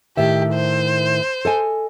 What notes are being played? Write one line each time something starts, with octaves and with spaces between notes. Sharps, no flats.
A2 D#3 G4 E5
C5
A4 D#5 G#5